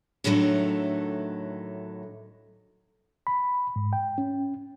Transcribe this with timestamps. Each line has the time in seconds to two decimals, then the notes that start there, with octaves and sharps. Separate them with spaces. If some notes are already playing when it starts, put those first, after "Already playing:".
0.24 A2 D3 D#3 F#3 A3
3.27 B5
3.76 G#2
3.93 G5
4.18 C#4